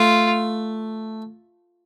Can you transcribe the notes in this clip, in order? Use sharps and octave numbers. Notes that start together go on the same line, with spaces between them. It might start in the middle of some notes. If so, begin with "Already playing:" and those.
Already playing: A3 F4